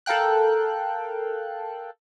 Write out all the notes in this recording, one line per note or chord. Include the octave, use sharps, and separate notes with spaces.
A4 A#4 F5 G5 F#6